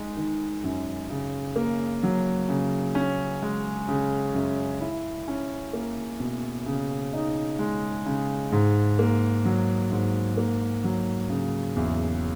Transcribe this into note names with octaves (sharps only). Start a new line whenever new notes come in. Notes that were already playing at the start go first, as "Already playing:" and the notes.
Already playing: G#3 D#4
D#3
F#2
C#3
A#3
F#3
C#3
C#4
G#3
C#3
F#2
E4
C#4
A#3
B2
C#3
D#4
G#3
C#3
G#2
A#3
F#3
G#2
A#3
F#3
C#3
E2